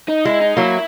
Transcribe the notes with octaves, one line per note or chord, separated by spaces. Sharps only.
D#4
G#3 E4
D#4
F#3 A#3 E4